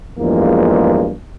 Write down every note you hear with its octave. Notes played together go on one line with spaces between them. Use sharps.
E2 G2 F3 G#3 A#3